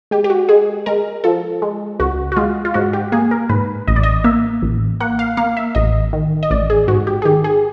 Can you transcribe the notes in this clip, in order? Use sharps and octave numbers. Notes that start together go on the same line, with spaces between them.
G#3 G4
G4
F#4
G#3 G#4
G#3 A#4
F3 A4
G#3
C#2 F#4
F#4
G#3 F4
F4
G#2 F#4
G4
A#3 G#4
A#4
G#2 B4
A1 D#5
D5
D#5
A#3 E5
A1
A#3 F#5
F5
A#3 F5
E5
A1 D#5
D#3
D#5
A1 D5
G#4
G#2 F#4
G4
G#4
D#3 G4
G#4